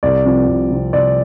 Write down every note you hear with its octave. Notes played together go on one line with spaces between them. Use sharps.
C2 D5
C3 F3 C4
C2
C3 F3 C4
C2 D5